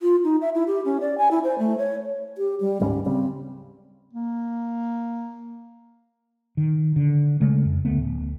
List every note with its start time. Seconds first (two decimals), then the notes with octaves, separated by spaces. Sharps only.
0.01 F4
0.24 D#4
0.41 E5
0.55 E4
0.67 G4
0.85 C#4
1.01 D5
1.18 G#5
1.31 E4
1.44 C5
1.59 A3
1.78 C#5
2.38 G4
2.61 G3
2.81 D1 G#2 G3 C#4
3.06 C#3 G3 C4
4.13 A#3
6.57 D#3
6.96 D3
7.40 C#3 G#3 A3
7.65 F2
7.85 D2 A3 B3
7.98 D1